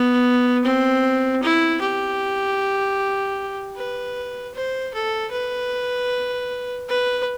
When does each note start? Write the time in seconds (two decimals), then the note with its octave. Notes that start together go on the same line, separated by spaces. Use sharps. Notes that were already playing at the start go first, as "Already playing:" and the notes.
Already playing: B3
0.64 C4
1.43 E4
1.81 G4
3.76 B4
4.54 C5
4.94 A4
5.31 B4
6.88 B4